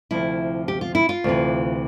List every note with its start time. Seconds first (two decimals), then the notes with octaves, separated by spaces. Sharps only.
0.11 D2 C3 F3 E4
0.68 G4
0.81 F4
0.95 E4
1.09 F4
1.24 D2 C3 E3